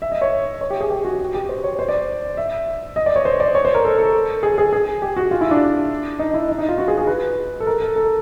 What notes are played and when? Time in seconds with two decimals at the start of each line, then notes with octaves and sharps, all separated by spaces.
0.02 E5
0.12 D#5
0.21 C#5
0.61 C#5
0.71 G4
0.81 G#4
0.90 G4
1.05 F#4
1.20 F#4
1.34 G4
1.49 C5
1.64 C#5
1.79 C5
1.89 D5
2.37 E5
2.96 D#5
3.06 D5
3.16 C#5
3.25 C5
3.40 D5
3.55 C#5
3.65 C5
3.74 A#4
3.85 A4
3.99 A4
4.43 G#4
4.58 G#4
4.73 G#4
5.02 G4
5.17 F#4
5.31 F4
5.41 E4
5.51 D4
6.19 D#4
6.34 E4
6.48 D#4
6.59 D#4
6.69 F4
6.78 F#4
6.88 G#4
6.98 G#4
7.07 B4
7.60 A4
7.67 A#4
7.82 A4
7.96 A4